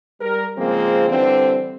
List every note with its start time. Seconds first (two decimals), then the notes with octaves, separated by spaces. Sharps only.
0.20 G3 A#4
0.57 C#3 F3 G#3 A#3 C4
1.09 D3 E3 G3 C4